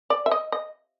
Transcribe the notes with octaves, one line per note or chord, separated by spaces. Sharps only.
D5
E5
D#5
D#5